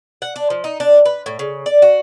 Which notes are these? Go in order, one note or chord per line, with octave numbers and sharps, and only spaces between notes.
F#5
D4
F3
D#4
D4
B4
A2
C#3
D5
F#4